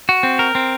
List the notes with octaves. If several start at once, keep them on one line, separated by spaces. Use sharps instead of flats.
F#4
C4
A#4
C4